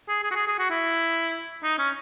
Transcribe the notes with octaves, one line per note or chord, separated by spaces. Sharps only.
G#4
G#4
F#4
G#4
G#4
F#4
E4
D#4
C#4